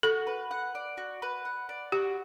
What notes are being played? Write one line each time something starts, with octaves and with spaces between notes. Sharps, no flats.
F#4 A4
B4
F#5
D5
F#4
B4
F#5
D5
F#4 G4